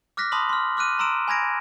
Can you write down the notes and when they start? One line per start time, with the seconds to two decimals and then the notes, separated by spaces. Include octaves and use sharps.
0.17 D6 F6 F#6 A#6 B6
0.32 A5 B5 C6 D#6 B6 F#7
0.49 C6 F6
0.77 D6 F6 F#6 D#7
0.99 A#5 C6 E6 D7 E7
1.28 G#5 B5 G#6 A#6 D7